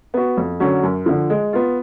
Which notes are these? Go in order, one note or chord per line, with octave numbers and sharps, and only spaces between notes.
B3 F#4
F2
D3 F#3 C#4
F#2
D3 F3
G#3
B3 F4